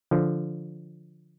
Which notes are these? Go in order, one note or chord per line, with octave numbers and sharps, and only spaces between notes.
D3 F3